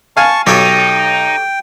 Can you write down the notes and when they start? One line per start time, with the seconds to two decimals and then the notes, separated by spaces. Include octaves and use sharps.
0.17 F5 G#5 A5 C#6
0.47 B1 D#4 G4 A4 C#5 G5